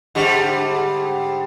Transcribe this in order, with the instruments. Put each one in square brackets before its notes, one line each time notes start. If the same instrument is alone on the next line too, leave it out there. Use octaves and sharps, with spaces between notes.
[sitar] G#2 D3 G3